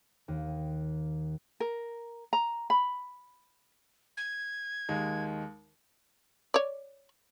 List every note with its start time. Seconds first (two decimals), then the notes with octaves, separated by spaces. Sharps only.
0.28 D#2
1.60 A#4
2.33 A#5
2.70 B5
4.17 G#6
4.89 D#2 D#3 G#3
6.54 C#5 D5